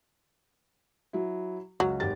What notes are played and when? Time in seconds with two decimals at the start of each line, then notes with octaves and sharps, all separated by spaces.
1.13 F#3 E4
1.80 C#2 F#3
2.00 G#1 G4 A6